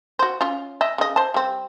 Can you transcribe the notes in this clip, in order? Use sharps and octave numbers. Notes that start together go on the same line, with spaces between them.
F#4 C5
C#4 F4
D#5 E5
C#3 D#5
C5 A5
G3 C4